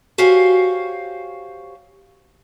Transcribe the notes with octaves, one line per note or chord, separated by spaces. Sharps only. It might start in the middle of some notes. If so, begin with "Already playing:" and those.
F#4 G4 C5 C#5 F5 G#5